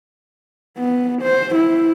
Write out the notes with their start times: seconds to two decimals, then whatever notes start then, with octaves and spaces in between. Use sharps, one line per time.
0.78 B3
1.22 C5
1.55 E4